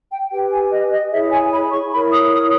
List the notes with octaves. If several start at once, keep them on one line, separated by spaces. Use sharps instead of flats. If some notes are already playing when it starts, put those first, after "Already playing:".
G5
G4 B4 G5
G#5
D#5
D#5
E4 G#4 C#5 E5
G#5
B5
C#6
E4 A#4 C#5 B5
D#6
D#6